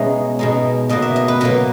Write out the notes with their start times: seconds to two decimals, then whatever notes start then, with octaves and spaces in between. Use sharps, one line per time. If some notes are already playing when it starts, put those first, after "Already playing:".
Already playing: B2 G#3 C#4 D#4 F#4 C#5 E5
0.39 B2 G#3 D#4
0.89 B2 F#3 A#3 D#5
1.02 E5
1.16 D#5
1.28 B4
1.41 B2 F#3 A#3 B4